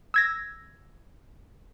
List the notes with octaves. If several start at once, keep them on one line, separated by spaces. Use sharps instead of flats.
E6 G#6 A#6